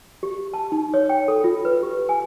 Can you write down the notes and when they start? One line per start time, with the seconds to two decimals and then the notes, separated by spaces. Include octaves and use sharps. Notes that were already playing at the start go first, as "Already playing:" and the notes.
0.23 G4
0.54 A5
0.72 D#4
0.94 C#5
1.09 G5
1.28 A4
1.44 F4
1.65 B4
1.83 G4
2.09 G#5